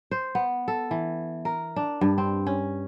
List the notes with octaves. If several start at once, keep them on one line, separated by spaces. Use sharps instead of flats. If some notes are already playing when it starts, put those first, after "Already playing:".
C5
B3
A4
E3
A#4
D4
G2
C4
C#4